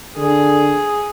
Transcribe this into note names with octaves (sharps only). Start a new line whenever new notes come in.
D3 G#4